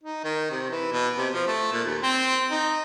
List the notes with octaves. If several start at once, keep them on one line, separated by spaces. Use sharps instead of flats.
D#4
D#3
C3
E3
B2
C3
F3
A3
A#2
D#2
C4
D#4